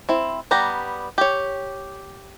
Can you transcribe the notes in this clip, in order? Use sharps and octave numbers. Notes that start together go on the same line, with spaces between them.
C4 E4
G3 B3 G4 A#5
G4 C#5